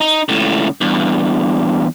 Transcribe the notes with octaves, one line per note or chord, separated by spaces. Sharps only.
D#4
C#2 A2
E2 G2